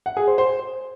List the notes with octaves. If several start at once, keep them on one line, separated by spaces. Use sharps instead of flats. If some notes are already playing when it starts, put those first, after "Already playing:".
F#5
G#4
C5
C5